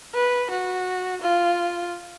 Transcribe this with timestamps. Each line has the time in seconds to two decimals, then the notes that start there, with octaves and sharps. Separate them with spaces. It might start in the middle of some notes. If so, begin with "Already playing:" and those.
0.14 B4
0.50 F#4
1.21 F4